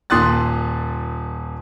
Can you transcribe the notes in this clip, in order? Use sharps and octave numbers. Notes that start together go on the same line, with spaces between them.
D#1 A#2 C6 D#6 F#6 A6